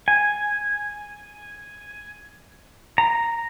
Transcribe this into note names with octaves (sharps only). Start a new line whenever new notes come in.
G#5
A#5